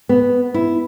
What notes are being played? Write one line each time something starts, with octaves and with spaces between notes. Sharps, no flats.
B3
E4